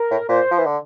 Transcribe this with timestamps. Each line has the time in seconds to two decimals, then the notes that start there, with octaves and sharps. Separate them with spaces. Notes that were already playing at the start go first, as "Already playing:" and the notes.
Already playing: A#4
0.11 A2
0.29 A#2 C5
0.51 F3
0.59 E3
0.66 D3